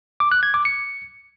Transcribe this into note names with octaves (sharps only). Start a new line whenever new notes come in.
D6
F#6
G#6
D6
C#7